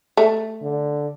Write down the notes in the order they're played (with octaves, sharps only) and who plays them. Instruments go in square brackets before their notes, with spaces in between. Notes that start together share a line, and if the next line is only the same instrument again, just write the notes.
[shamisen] A3
[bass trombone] D3